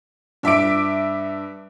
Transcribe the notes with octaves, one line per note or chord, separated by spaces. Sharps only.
G2 E5 D6 D7